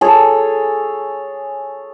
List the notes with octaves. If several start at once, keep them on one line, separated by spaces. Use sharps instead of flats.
G#4 A4 C#5